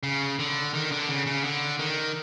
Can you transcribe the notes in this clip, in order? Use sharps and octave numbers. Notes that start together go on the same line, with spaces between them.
C#3
D3
D#3
D3
C#3
C#3
D3
D#3